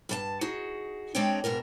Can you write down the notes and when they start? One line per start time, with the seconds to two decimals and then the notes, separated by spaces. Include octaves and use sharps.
0.09 G2 A#4 A5
0.41 D#4 F#4 G#4
1.15 G#3 C4 D4 D#4 C#5 G5
1.44 G#2 B2 D4 A#4